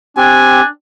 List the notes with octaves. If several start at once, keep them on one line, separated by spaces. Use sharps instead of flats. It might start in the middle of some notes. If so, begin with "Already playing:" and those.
C4 D4 G4 G#5